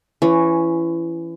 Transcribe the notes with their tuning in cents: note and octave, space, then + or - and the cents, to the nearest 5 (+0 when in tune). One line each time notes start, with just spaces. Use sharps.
E3 +25 C#4 +0